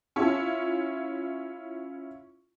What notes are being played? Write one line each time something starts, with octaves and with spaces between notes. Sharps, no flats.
C#4 E4 F4